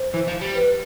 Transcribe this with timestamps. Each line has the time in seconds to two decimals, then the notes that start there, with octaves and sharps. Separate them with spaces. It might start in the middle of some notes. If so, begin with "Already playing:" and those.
Already playing: C5
0.14 E3
0.28 F3
0.41 G3
0.55 B4